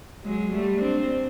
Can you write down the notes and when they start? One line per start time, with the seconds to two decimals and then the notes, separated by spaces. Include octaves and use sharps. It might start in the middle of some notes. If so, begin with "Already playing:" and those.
0.24 F#3 G#3
0.53 G3 A3
0.82 C4 D4